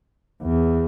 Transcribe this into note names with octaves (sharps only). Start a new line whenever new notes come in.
E2